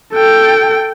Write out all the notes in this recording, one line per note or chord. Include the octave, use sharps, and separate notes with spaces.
A4 G5